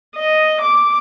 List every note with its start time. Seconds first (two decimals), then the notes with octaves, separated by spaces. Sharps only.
0.16 D#5
0.62 D6